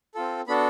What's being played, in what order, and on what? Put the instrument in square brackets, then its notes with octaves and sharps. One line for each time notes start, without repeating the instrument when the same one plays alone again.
[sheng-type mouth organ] C4 F4 A4
B3 D4 F#4 A4 B5